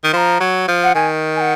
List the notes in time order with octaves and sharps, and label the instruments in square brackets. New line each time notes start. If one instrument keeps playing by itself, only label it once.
[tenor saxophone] D#3
[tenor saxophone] F3 [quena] A#5 C6
[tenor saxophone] F#3
F3
[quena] F#5
[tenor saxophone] D#3 [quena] G#5
[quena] G#5
F#5